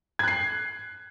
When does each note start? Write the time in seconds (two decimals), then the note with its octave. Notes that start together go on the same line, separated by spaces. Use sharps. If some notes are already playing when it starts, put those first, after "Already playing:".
0.19 G#6
0.23 F#6
0.28 C7